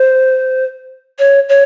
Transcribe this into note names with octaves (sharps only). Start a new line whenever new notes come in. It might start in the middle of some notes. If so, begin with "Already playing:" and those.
Already playing: C5
C#5
C#5